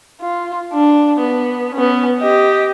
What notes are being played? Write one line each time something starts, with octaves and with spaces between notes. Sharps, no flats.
F4
D4
B3
B3 C#4
G4 D#5